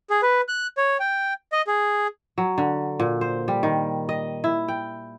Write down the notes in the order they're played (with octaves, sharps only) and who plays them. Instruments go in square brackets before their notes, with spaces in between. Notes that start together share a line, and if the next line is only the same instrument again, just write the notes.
[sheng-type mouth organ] G#4
B4
F#6
C#5
G5
D#5
G#4
[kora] F#3
D3
A#2
C5
G3
D#3
D#5
E4
G5